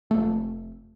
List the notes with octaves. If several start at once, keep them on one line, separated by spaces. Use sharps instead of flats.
F1 A3